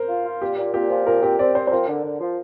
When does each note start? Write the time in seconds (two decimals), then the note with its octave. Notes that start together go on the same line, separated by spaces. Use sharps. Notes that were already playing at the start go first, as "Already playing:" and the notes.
Already playing: A#4 C5
0.09 F4
0.25 F4
0.42 A#2 G4
0.58 A#2
0.74 A#2 G4
0.90 F3
1.06 A#2 A#4
1.23 C4 G4
1.39 C4 D5
1.55 C4 C5
1.67 C5
1.71 F3 A#4
1.88 D3
2.04 D3
2.20 F3